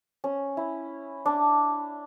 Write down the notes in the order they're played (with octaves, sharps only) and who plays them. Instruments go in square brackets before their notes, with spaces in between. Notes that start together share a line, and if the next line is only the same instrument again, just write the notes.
[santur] C#4
E4
D4